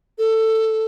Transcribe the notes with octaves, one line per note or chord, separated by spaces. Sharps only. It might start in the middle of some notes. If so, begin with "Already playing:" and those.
A4